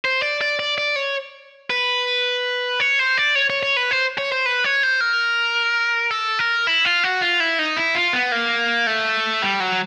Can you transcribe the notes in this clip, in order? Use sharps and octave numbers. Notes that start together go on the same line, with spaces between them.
C5
D5
D5
D5
D5
C#5
B4
C#5
C5
D5
C#5
C#5
C#5
B4
C5
C#5
C5
B4
C#5
C5
A#4
A4
A#4
E4
F4
F#4
F4
E4
D#4
E4
F4
B3
A#3
A3
G3
F#3